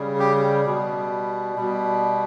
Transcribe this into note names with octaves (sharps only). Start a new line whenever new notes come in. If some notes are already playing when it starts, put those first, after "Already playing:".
Already playing: C#3 G3
G4
B2 G3
B2 G3